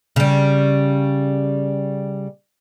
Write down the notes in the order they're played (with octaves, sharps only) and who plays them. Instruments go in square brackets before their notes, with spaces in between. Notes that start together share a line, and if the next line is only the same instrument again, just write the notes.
[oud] C#3 G3